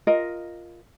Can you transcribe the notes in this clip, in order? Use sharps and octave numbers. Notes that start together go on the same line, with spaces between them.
F4 A#4 D#5